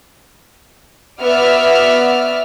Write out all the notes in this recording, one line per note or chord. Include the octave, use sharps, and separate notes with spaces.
B3 F#4 D5 E5 F6